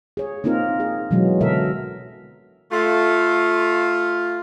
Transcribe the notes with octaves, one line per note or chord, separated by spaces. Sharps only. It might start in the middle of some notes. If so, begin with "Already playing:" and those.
G#4 C#5
A#3 C4 D#4 F4 A#4
G#4
B2 E3 F#3 G#3
B2 D3 A4 A#4 E5
A3 F4